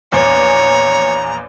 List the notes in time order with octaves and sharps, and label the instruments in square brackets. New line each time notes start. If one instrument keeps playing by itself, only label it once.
[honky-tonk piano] A#1 E2 [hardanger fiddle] C#5 [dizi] A#5